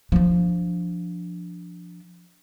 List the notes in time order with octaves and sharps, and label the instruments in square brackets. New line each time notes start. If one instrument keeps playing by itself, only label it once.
[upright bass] F3 D4